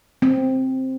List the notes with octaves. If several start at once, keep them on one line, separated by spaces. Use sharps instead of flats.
C4